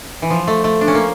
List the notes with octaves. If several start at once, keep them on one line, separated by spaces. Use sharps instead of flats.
E3
F3
A3
A3
D4
C#4
A#3